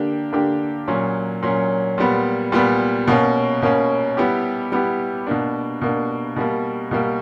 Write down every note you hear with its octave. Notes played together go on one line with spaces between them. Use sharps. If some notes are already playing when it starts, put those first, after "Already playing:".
Already playing: D3 A#3 D4 G4
D3 A#3 D4 G4
A#2 F#3 C#4
A#2 F#3 C#4
A#2 G3 B3
A#2 G3 B3
B2 A#3 C#4
B2 A#3 C#4
G3 B3 E4 G4
G3 B3 E4 G4
B2 A#3 D4
B2 A#3 D4
B2 G3 A#3
B2 G3 A#3